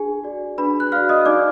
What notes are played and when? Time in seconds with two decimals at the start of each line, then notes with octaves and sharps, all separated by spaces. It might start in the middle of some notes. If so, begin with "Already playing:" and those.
Already playing: D4 G#4 G#5
0.24 F#4 D5
0.58 D4 B4 B5
0.80 F#6
0.92 F#4 D5 F5 F6
1.09 D#5 D#6
1.26 D#4 D5 D6